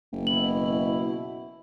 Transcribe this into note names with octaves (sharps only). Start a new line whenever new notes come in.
F#1
B2 E4 F#7